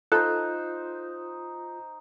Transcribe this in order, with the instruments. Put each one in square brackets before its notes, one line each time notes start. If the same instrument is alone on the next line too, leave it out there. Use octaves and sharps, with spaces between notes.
[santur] D#4 C5 [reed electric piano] F4 [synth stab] A4 [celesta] F#6